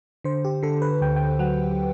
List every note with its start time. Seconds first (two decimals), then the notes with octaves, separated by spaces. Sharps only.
0.24 D3 C5
0.45 G4
0.63 D3 A4
0.82 B4
1.01 D2 G5
1.16 G5
1.39 F#3 F#5